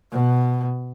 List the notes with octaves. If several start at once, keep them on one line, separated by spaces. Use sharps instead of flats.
B2